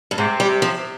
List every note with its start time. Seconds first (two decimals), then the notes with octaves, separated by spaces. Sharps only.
0.11 G2
0.18 G#2 C3
0.40 G3
0.48 C3
0.62 F3
0.77 C3